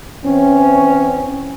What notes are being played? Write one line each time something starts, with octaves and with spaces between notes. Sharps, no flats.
E3 C4 C#4